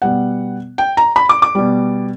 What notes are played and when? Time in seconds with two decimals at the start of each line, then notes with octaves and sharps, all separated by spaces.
0.02 B2 G3 F#5
0.78 G5
0.97 A#5
1.16 B5
1.29 D6
1.42 D6
1.55 B2 G3